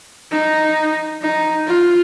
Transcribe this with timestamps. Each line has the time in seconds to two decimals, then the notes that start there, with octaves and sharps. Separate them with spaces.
0.31 D#4
1.22 D#4
1.67 F4